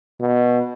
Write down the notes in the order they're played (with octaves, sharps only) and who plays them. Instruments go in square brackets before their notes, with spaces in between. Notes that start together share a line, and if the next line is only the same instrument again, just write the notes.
[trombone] B2